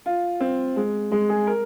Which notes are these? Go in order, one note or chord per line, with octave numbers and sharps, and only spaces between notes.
F4
C4
G#3
G#3
G#4
A#4